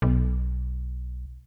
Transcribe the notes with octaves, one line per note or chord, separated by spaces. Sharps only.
B1